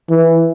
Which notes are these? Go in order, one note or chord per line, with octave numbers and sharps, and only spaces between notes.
E3